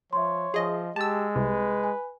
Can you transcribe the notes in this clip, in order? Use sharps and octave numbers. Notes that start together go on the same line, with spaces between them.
F3 C#5 E5 C6
F3 G#4 D#5
G#3 G4 A5 E6 A6
C2 C3 B4
G#5